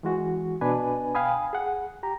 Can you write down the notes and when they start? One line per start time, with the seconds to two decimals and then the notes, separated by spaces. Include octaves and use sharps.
0.03 E3 G#3 F#4
0.61 B2 D4 B4 G#5
1.15 F5 G5 G#5 B5 D#6
1.53 G#4 F#5
2.03 G4 A#5